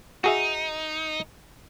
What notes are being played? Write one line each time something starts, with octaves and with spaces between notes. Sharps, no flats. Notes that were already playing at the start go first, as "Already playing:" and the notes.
D#4 F#4 G#4 E5